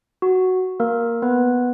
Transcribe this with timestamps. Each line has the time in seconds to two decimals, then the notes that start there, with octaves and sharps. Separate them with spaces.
0.22 F#4
0.80 A#3 A#4
1.22 B3 B4